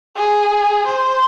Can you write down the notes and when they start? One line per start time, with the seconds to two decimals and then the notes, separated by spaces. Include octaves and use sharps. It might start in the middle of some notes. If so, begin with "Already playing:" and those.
0.16 G#4
0.86 C5